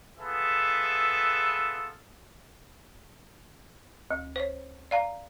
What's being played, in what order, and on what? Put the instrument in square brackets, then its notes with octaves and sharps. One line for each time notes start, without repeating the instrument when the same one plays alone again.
[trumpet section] B3 F4 G#4 A4 B4 E5
[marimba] D2
C5 C#5
D5 F5 A#5